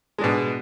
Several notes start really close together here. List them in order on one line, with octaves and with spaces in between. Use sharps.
G#3 D4 B2